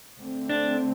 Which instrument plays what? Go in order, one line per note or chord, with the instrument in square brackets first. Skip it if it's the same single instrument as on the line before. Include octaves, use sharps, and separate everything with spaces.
[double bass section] D3 A3 C4
[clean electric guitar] D4